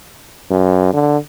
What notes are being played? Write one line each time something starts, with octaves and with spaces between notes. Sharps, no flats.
F#2
D3